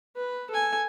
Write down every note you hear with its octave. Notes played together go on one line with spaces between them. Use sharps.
B4
A4 G#5